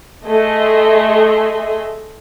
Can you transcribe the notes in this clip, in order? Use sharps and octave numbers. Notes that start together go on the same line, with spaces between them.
A3 G#4 D#5 E5 C6